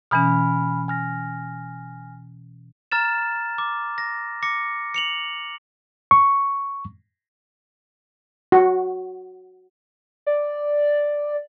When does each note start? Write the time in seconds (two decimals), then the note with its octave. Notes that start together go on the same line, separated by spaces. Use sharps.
0.11 B2 E3 C#4 G#5 B5 F6
0.88 G#5 F6 A#6
2.92 A#5 F6 A6 E7
3.58 D6
3.98 A#6
4.43 D6 A#6 C#7
4.94 C#7 F7 F#7
6.11 C#6
8.52 F#4
10.27 D5